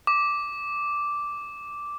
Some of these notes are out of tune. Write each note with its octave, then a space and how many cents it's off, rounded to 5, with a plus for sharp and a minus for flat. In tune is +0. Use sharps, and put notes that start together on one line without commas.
D6 -5